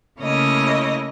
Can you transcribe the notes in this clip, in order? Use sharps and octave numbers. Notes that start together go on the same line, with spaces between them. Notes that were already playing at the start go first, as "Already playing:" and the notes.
C#3 A3 A#3 E4 C#5 D#5